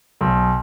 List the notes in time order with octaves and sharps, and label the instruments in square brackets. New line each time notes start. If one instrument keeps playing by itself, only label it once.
[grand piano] B1